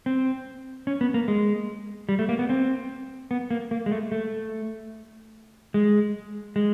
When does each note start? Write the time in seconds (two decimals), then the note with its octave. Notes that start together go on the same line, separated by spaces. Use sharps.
0.06 C4
0.87 C#4
1.01 B3
1.14 A#3
1.28 G#3
2.09 G3
2.19 A3
2.29 A#3
2.39 B3
2.50 C4
3.31 B3
3.51 A#3
3.71 A#3
3.86 G#3
3.92 A3
4.12 A3
5.74 G#3
6.56 G#3